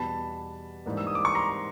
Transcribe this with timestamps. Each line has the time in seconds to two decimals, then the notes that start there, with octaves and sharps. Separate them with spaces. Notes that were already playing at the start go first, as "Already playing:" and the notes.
Already playing: E2 B2 G3 B3 A5 B5
0.85 G#2 E3 G3 A#3 D4
0.97 E6
1.07 D#6
1.15 D6
1.25 C#6
1.35 A#5 C6